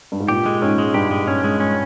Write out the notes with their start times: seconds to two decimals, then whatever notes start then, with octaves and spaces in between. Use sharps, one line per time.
0.12 G2
0.20 G#2
0.28 A#2 G4
0.46 G#3
0.62 G#2 C#4
0.78 G#3
0.94 G2 G4
1.11 G#3
1.28 C#4
1.44 G#3
1.60 C#4